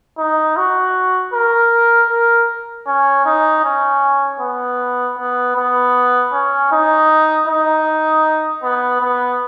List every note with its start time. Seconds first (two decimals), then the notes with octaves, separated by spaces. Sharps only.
0.19 D#4
0.57 F#4
1.34 A#4
2.10 A#4
2.87 C#4
3.26 D#4
3.64 C#4
4.41 B3
5.18 B3
5.56 B3
6.32 C#4
6.72 D#4
7.48 D#4
8.63 B3
9.02 B3